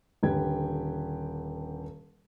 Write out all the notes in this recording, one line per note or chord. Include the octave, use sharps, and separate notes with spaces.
D#1 D3 G4 B4 G5 G#6